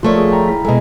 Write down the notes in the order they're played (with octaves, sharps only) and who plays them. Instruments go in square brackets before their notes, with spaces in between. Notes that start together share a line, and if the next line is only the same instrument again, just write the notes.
[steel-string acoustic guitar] F3 A3 C#5 [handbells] F4 A#4 D5
[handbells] G#4
G5 A#5
E4 B6
[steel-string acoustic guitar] B2 G#3 [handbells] A4 D#5